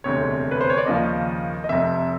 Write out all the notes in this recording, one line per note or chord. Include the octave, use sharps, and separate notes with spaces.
E1 D2 C3 C#5
B4
C5
C#5
D5
D#2 C#3 F3 D#5
D#5
F1 F2 C3 E5